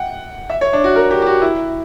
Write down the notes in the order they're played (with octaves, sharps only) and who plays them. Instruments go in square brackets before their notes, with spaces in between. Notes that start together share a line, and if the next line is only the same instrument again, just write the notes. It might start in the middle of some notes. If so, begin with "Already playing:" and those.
Already playing: [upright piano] F#5 G5
E5
C#5
D4
F#4
A#4
G4
G4
F#4
E4